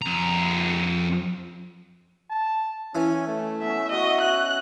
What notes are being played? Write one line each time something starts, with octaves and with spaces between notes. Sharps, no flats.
F2 A#5
A5
E3 C#4
A3
B3 C#4 E5
F#4 D#5 E5 C#6
C#5 E5 F#6